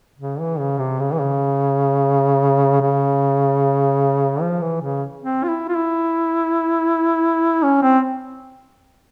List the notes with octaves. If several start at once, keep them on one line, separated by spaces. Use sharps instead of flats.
C#3
E3
C#3
C3
C#3
E3
C#3
C#3
F3
E3
C#3
C4
F4
E4
F4
E4
C#4
C4